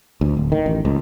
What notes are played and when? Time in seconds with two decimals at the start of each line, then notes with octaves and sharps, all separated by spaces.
0.21 D2
0.37 D1
0.52 D#3
0.66 A1
0.85 C#2